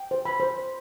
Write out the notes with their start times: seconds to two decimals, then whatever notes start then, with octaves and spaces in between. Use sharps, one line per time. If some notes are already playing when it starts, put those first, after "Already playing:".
Already playing: G5
0.11 C5
0.25 B5
0.40 C5